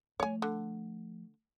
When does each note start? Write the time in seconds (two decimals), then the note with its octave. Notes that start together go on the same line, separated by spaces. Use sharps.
0.20 F3 A3 C#5 G#5
0.42 D3